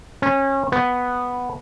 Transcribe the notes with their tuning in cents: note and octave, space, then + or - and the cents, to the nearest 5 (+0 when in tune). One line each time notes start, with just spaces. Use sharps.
C#4 -25
B3 +0